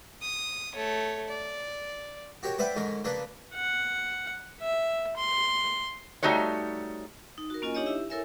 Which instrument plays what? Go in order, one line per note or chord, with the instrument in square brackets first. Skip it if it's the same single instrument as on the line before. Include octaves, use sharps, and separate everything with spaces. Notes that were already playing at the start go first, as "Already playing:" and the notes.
[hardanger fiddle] D#6
A3 C#5
D5
[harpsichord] F#4 G4 A#4 C#5
B4 C5 D5 E5 F#5 G5
G#2 D3 C#4 A#4
C#3 A#3 D4 A4 B4
[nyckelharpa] F#5
E5
C6
[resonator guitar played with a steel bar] G3 A3 D#4 F#4 B4 C#5
[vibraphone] D#4
F#4 A#4
A#3 C#4 F4 D#5 G#5
D4 D#4 G4 C#5 D#5
E4 G4 E5
E4 A4 A#4 C#5 E5 G#5